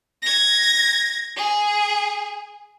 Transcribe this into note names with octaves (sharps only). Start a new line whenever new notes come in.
G#6 A#6
G#4